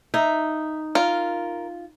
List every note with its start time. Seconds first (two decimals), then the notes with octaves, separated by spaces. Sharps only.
0.14 D#4 E5
0.95 F4 A#4